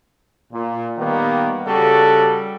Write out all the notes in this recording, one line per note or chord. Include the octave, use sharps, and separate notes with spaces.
A#2
D#3 G3 A#3 B3
C#3 G3 F#4 A4